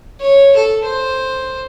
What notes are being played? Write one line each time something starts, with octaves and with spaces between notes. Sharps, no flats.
C#5
A4
C5